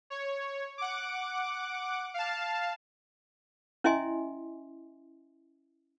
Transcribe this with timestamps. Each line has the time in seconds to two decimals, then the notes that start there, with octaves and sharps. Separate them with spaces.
0.10 C#5
0.78 F#5 D6
2.14 F5 A5
3.84 C#4 E4 D#5 E5 G#5 C6